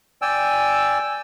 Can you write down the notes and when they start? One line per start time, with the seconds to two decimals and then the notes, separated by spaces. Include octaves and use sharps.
0.22 D5 G5 G#5 E6